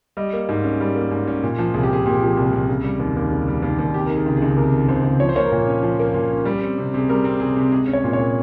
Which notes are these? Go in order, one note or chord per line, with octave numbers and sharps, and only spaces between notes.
G3 D#5
A#3
G#2
C#4
G3
A#3
G#2
C#4
A#2
F3
C2 G#4
G4
C2 G#4
A#2 G4
F3 G#4
C2
C2
C#3
G3
D#2
D#2
C#3
G3
D#2
D#2
C3 G4
D#3 A#4
G#4
C#2
G#4
C#2
C3 A#4
D#3
C#2 C5
C#2
F3 C#5
C5
A#3 C#5
A#4
A#2 C5
C#4
F3
A#3
A#2
C#4
G3
C4
C3
C3 G#4
G3 A#4
C4
C3 G#4
C3
G#3 G#4
C#4
C#5
A#2
C#5
A#2